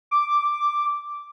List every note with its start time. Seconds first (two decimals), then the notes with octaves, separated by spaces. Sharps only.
0.11 D6